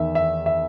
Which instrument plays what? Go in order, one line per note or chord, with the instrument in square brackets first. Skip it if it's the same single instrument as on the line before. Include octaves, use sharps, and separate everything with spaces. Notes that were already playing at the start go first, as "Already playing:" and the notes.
Already playing: [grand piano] E2 D#3 E5
E5
E5